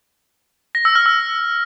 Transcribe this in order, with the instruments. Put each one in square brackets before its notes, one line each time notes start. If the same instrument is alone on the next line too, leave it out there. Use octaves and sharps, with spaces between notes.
[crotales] A#6
E6
F6
E6